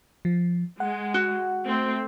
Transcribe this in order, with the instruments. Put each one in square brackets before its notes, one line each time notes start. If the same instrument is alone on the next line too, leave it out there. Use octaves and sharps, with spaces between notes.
[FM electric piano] F3
[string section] G#3 [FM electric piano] F#5
[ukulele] F#4
[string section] A3 C4